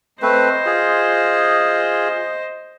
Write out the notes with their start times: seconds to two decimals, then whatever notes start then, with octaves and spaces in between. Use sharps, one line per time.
0.22 A3 C4 B4 C5 D#5
0.66 F4 G#4